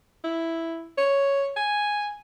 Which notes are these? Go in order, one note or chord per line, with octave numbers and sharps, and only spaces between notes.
E4
C#5
G#5